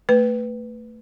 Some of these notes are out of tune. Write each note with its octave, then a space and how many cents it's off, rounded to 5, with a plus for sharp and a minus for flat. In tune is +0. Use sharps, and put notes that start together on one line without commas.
A3 +25 B4 +0